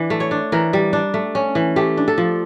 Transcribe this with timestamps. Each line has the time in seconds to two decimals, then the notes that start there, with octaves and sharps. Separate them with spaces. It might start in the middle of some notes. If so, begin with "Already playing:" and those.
Already playing: E3 D4
0.10 A3
0.20 C#5
0.31 D4
0.52 E3 A#4
0.73 G3
0.93 D4
1.14 A3
1.35 C#4
1.55 E3
1.76 A3 G4
1.97 D4
2.08 A4
2.18 F3